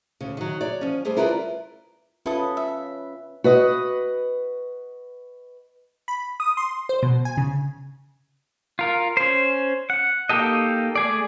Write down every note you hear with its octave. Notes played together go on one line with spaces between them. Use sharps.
D2 C#3
D#3 F#3
C#5 D5
F3 C#4
G3 A3 G#4 C5
E4 F4 A#4 B4 C#5 D5
C#4 E4 F4 A4 B4 D#6
E5
F#4 B4 D#5
B5
D#6
C6
C5
B2
G#5
C#3
F4 A#4
C#4 C5
F#5
A#3 D#4 G4 A4 D#5
A3 G#4 D5